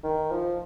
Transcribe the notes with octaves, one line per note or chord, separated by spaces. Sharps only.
D#3
F3